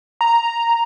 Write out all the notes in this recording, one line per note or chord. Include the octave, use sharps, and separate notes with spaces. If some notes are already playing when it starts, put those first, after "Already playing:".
A#5